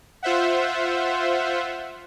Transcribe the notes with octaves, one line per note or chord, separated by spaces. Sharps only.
F4 C5 E5 F#5